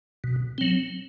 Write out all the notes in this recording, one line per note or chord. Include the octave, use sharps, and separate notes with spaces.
B2
F#3 C4